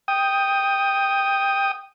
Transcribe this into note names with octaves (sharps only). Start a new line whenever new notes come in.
G5 D#6